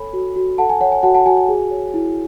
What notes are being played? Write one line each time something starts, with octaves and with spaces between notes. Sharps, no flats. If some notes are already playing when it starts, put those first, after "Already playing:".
Already playing: A4 C#5 G#5 B5
F#4
F#4
A4 F#5 A5
G#5
C#5 F#5
G#5
F#4 F#5 A5
F#5 A5
F#4 G#5
G#5
G#4
C#5
E4